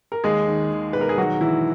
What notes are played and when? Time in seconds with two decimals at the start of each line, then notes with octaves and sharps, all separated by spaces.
0.12 A#4
0.24 D#2 G#3 G#4
0.48 D#3
0.71 D#3
0.93 E1 B4
1.01 A#4
1.09 G#4
1.18 D#3 F#3 F#4
1.41 D#3 E3 E4